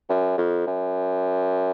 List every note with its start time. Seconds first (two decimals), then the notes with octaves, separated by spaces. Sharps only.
0.09 F#2
0.38 F2
0.67 F#2